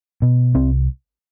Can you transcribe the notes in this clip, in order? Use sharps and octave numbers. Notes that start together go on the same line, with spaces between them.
B2
C2 C4